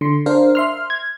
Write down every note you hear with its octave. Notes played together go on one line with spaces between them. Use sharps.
D3 C6
D4 A#4 C5 F5
E5 C6 F6
G#6